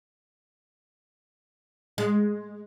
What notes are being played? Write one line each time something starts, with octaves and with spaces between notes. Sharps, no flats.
G#3